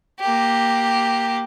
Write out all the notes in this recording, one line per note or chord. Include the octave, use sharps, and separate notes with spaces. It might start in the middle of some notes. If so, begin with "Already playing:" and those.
A#3 G4